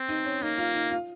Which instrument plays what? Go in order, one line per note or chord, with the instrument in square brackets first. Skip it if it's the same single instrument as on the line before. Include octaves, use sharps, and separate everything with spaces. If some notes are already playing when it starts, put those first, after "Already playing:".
Already playing: [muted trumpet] C4
[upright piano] D#4
C#4
[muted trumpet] A#3 [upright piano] D#4
[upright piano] F4
D#4
F4